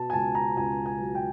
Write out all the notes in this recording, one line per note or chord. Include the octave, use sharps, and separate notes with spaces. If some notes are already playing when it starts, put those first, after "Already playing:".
Already playing: B2 A5
G#5
C#2 A5
A#5
C#2 G#5
G#5
F#3
G5